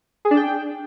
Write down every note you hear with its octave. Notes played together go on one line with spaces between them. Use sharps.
G#4
D4
G5